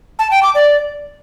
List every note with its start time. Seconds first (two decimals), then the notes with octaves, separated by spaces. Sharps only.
0.19 A5
0.31 G5
0.43 D6
0.55 D5